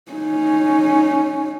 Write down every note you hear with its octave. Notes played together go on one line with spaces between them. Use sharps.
C#4 D#4